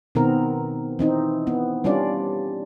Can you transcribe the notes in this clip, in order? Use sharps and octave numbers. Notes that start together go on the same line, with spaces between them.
B2 D#3 B3 C4 A#4
E3 C4 D#4
B3
G3 C#4 D4 F4 D5